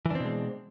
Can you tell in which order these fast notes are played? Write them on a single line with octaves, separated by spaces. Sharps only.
E3 D4 C4 B2 G#3